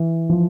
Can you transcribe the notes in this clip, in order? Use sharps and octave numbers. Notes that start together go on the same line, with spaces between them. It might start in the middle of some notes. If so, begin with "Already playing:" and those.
Already playing: E3
F3